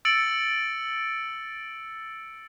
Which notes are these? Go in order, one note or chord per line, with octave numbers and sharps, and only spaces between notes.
E6 A6 C#7 D7 F#7